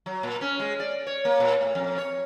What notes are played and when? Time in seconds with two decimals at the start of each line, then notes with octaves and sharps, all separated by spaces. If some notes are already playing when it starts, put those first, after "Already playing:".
0.06 F#3
0.23 A#2
0.41 C#4
0.60 G#3
0.80 D5
1.07 C#5
1.25 A#3
1.40 A#2
1.61 A2
1.75 F2
1.98 C#5